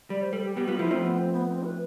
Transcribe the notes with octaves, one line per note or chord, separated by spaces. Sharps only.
G3 D5
C5
G3 A4
G4
G3 B3 G4
G3 B3 F4
F3 A3 E4
F3 A3 C4
B3
C4
B3
C4
B4